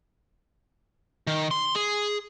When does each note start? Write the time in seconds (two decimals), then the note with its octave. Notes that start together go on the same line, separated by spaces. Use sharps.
1.27 D#3
1.51 C6
1.76 G#4